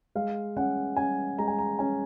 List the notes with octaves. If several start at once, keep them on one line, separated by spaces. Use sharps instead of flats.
G#3 F5
C#4 F#5
C#4 G#5
G#3 A#5
G#5
A#5
C#4 G#5